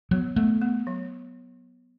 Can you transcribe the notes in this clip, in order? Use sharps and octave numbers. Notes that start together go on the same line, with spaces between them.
F#3 B3
A3 B3
B3
F#3